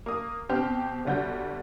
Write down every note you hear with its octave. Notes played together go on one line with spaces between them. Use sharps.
A#3 D#6
B2 C4 G4 G5 F6
G1 D2 G3 F#4 G6